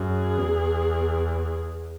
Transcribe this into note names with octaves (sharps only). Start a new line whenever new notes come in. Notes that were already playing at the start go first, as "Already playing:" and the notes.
Already playing: F#2 G#4
E2